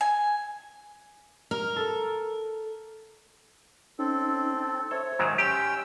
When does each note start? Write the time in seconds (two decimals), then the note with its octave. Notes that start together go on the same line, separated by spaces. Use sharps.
0.01 G#5
1.51 A#4 F6
1.76 A4
3.99 C4 C#4 D#4 A4
4.57 G5 A5
4.91 A4 C5 C#5 E5
5.19 G#2 D#3 F#3
5.38 C#4 G4 G5 C6 E6